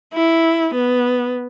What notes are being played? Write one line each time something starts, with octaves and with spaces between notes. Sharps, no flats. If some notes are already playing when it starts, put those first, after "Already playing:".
E4
B3